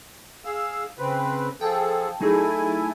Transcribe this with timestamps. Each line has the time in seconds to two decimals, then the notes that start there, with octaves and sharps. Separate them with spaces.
0.45 G#4 F5 E6
0.98 C#3 C4 B4
1.61 F3 G#4 A4 G5 A5
2.21 F#3 A3 D#4 E4 G#4 G#5